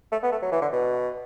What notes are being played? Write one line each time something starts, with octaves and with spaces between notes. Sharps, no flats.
A3
B3
A3
F#3
E3
D3
B2